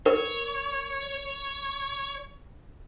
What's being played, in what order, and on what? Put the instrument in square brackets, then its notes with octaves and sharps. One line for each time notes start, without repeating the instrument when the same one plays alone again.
[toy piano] A#4 [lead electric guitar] C#5